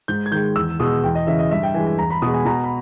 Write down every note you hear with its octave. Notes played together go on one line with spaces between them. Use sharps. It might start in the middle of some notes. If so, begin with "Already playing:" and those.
G#2 G6
G#6
D#3 G#3 G6
E2 E6
B2 G#3 D#6
E2 G5
D#5
C#3 E3 E5
D#5
G2 E5
G5
E3 G#3 G#5
G#5
E2 A#5
B5
B2 G#3 D#6
G#5
B2 A#5
B5